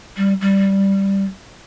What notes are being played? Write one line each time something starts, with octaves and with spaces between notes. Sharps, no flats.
G3
G3